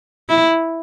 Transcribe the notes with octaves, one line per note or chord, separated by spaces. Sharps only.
E4